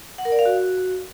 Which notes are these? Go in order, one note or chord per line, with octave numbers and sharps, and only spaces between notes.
F#5
A#4
D5
F5
F#4